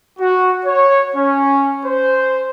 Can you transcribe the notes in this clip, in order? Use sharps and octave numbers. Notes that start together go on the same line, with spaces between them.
F#4
C#5
C#4
C5